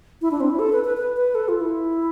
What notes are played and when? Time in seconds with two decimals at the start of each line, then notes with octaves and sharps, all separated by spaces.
0.22 E4
0.31 D4
0.40 C4
0.50 E4
0.59 A4
0.73 B4
0.84 B4
0.97 B4
1.17 B4
1.35 A4
1.48 F4
1.61 E4